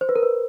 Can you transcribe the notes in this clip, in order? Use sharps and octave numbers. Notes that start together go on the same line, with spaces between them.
C5
B4
A#4
B4